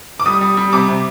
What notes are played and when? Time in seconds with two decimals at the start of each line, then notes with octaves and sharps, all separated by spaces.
0.20 D6
0.26 G3 D#6
0.41 G3
0.57 G3
0.73 C3 D6
0.88 C3